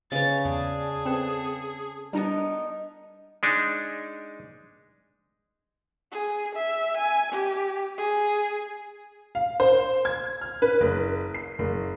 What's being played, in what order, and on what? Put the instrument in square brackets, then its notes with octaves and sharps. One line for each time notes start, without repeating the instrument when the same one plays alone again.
[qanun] C#3 C#5 [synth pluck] B4 D#5 [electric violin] A6
[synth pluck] E2 [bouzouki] D4 [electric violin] G#4
[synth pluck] C4 B4 [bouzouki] A4
[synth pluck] G3 D4 A5 [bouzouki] B3 D#4 A#4
[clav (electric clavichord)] G#3 D4 D#4
[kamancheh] G#4
E5
G#5
G4
G#4
[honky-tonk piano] F5
C5
G#6
F6
B4
F#1
C7
F#1